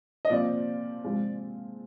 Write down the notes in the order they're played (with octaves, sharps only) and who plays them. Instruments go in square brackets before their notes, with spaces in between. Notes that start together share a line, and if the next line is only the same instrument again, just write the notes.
[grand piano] D#5
[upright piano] A#2 F3 C4 F4 [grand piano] D5
[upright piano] F3 G#3 C4 F4